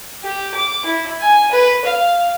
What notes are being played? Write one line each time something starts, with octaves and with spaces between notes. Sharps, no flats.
G4
D6
E4
G#5
B4
F5